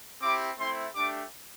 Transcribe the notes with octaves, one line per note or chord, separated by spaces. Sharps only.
C4 E4 G4 D6
A3 C4 E4 C6
A3 D4 G4 D6